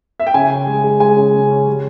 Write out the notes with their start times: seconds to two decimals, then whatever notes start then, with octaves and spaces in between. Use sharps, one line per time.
0.20 E5
0.27 G5
0.34 C#3 G#5
0.50 C#4
0.67 G#3
0.84 G#3
1.00 G#3 G#5
1.17 C#3
1.34 C#3
1.50 C#4
1.67 G3